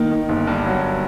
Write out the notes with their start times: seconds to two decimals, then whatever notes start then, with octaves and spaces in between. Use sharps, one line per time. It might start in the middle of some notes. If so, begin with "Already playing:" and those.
Already playing: D#3 A#3
0.10 D#3
0.29 G1
0.47 G2
0.66 F#3